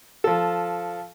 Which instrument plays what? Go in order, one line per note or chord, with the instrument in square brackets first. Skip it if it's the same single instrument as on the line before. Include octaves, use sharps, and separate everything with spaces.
[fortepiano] F3 A4